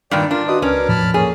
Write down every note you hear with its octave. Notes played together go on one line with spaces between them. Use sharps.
G2 A#2 D#3 D5 G5
D4 F4 A#4
F#4 B4 D#5 C6 D#6
C#2 C#4 D4 A#4 B4 D6
E2 A2 F3 A5 B5 F6
A#3 C#4 G#4